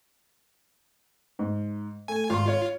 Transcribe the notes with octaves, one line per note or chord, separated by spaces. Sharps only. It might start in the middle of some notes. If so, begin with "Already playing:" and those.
G#2
A3 G#5
G#1 F4 C6
C#5